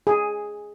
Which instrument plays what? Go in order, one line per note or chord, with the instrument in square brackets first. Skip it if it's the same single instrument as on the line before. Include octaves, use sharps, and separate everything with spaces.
[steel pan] G#4